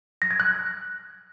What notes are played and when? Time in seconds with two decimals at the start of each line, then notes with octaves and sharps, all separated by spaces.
0.22 A#6
0.31 G#6
0.40 F#6